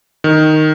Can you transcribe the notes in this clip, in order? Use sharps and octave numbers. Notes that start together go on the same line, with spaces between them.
D#3